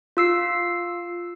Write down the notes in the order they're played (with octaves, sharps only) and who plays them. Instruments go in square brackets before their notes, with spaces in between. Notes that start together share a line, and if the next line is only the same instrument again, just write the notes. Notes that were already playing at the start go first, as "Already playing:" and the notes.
[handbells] F4 E6 C7